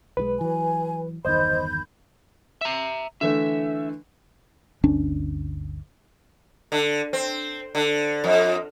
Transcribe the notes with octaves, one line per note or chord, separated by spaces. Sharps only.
B1 D#3 G#3 B4
E3 F#3 G#5
G1 E2 D#3 C5 D#5 B5 G6
E5 A#5
D3 E3 A3 E5
G1 D2 C#4 D4
D3
C4
D3
F2